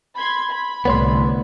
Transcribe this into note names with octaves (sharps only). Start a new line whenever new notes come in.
B5 C6 G#6
B5
C2 A2 D3 B3 C#5 C6